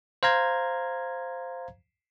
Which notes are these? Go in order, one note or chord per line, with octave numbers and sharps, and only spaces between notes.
C5 F5 A#5 G#6